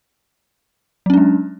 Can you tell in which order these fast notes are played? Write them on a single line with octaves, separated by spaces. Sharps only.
F#3 C#4 D4 G#3